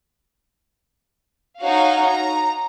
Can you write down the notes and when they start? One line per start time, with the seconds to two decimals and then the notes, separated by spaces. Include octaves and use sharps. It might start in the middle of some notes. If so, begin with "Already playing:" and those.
1.61 D#4 F#4 C#5 F5
2.07 A#5